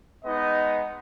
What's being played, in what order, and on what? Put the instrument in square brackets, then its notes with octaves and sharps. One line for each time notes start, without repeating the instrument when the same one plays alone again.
[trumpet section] G#3 B3 D#4 D#5